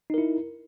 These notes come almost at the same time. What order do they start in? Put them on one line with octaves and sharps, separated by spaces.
D#4 A#4 E4